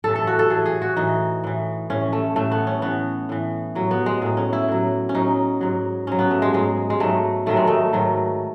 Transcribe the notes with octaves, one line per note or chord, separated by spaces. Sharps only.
A2 E3 A4
A4
F#4
A4
A2 E3 G#4
G#4
F#4
A2 E3 D#4
A2 E3
A2 E3 C#4
A3
A2 E3 A3
B3
C#4
A2 E3 B3
A2 E3
A2 F#3
B3
G#3
A2 F#3
C#4
E4
A2 F#3
C#4
A2 F#3 D#4
G#2 F#3
G#2 F#3 C#4
B3
A3
G#3
G#2 F#3 G#3
G#3
G#2 F#3 A3
G#2 D#3 F#3 A3
G#3
A3
G#2 D#3 F#3